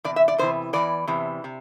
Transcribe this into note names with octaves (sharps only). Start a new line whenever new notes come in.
E2 C3 D5
E5
D5
E2 C3 E3 C5
E2 C3 E3 D5
E2 C3 E3
C3